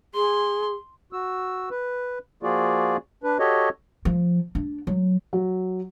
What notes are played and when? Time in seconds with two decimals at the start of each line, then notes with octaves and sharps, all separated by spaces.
0.14 G#4 C6
1.13 F#4 E6
1.71 B4
2.43 F3 A#3 F4 F#4 G#4 D5
3.23 D4 B4
3.39 F#4 G4 A4 C#5 D#5
4.05 F3
4.55 D4
4.87 F#3
5.33 F#3